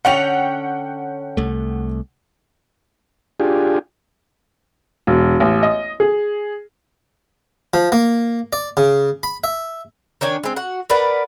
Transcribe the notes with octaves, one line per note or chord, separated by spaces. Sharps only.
D3 C#4 C#5 F#5 G5 F7
C2 A3
D4 F4 G4 G#4
E1
A1
D#5
G#4
F3
A#3
D5
C#3
B5
E5
D#3 D4 C#5 G#5
G#3 C4
F#4 F#5
A#4 B4 D5 F#5